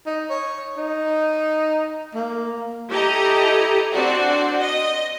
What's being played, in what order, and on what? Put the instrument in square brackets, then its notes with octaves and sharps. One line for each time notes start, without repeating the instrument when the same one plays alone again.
[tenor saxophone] D#4
C#5
D#4
A#3
[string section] E4 G4 A4 D#5 A#5
C4 D4 F#4 D5
D#5